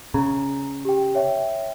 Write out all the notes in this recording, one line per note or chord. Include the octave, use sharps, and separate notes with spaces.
C#3 A#5
G4 G5
C#5 E5 G5